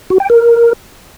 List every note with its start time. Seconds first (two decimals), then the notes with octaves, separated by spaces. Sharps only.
0.10 F#4
0.20 G5
0.30 A#4